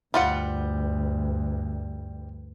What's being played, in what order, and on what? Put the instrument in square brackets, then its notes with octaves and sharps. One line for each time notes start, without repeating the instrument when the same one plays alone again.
[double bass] D2 G2 [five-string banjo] G3 F4 F#5